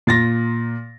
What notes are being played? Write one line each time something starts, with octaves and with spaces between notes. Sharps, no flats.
A#2 A6 A#6